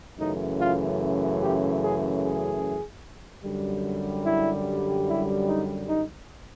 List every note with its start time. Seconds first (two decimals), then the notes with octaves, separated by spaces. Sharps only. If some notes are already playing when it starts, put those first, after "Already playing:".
0.18 F#2 C#3 E3 A3 D#4
0.59 F4
1.40 G4
1.82 G#4
2.22 G#4
3.44 F#2 D3 G3
4.25 E4
5.07 E4
5.48 D#4
5.89 D#4